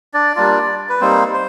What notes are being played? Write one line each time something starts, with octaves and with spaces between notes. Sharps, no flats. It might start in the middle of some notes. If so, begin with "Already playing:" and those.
D4 D5
G3 A#3 D4 F4
B4
G3 A#3 C4 D#4 C5
C5